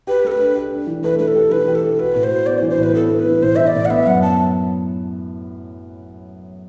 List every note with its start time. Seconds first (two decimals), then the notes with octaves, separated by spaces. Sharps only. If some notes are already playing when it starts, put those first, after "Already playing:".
0.07 G4 B4
0.24 A3 A4
0.32 B4
0.40 D4
0.55 G4
0.72 D4
0.87 E3
1.03 A3 B4
1.19 A3 B4
1.28 A4
1.35 G4
1.51 E3 B4
1.68 G4
1.75 A4
1.83 A3
1.99 F#4 B4
2.15 A2
2.23 C5
2.31 F#4
2.46 B3 D5
2.58 C5
2.62 E3
2.70 C5
2.78 A2
2.83 B4
2.94 B3 A4
3.11 B3
3.19 B4
3.26 E3
3.42 A2 C5
3.56 E3 E5
3.67 D5
3.75 A2
3.85 F#5
3.90 B3 E5
4.07 F#2 F#5
4.22 B3 A5